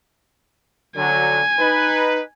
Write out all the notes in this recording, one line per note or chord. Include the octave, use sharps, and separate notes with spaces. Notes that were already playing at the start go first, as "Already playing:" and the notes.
D3 F#3 G#5
D#4 B4